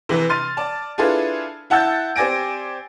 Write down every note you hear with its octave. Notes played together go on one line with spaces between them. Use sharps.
C3 E3 B4
C6 F6 A6 D#7
D5 A5
D4 E4 F4 G#4 A4 B4
E4 F#5 A5 E6 G6 A6
C4 G4 D5 G#5 A#6 D7